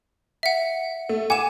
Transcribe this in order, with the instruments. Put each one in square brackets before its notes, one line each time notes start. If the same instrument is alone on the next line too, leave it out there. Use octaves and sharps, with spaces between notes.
[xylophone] E5 F#5
[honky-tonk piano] A3
[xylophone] F#5 E7 [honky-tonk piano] G#5 D6